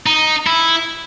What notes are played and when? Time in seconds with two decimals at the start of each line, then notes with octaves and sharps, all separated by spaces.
0.06 D#4
0.47 E4